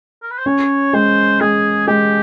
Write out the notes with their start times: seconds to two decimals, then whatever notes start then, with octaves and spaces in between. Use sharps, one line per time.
0.23 A#4
0.31 B4
0.38 C5
0.46 C#4 C#5
0.93 G#3 C5
1.41 G#3 G#4
1.87 G#3 G4